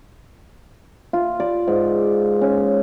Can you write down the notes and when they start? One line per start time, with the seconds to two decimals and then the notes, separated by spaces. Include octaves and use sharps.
1.13 F4
1.40 D5
1.68 G#2
2.41 C#4